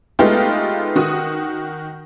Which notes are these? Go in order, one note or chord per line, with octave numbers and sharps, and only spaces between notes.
G#3 A3 B3 D#4 F4 G4
D#3 F#4 D#6